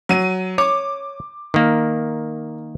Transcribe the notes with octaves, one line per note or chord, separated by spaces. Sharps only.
F#3 D#7
C#5 D6
D#3 A#3